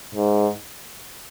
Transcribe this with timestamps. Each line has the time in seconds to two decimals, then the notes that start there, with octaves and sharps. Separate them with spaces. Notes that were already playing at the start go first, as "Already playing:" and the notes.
0.14 G#2